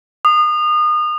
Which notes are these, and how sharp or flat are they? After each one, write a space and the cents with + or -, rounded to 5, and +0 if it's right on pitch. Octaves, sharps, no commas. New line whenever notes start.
D#6 -30